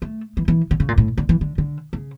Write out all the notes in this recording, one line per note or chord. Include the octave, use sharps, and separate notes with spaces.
A3
E3
E3
D3
C#3
A#2
A2
D3
E3
D3
D3
C#3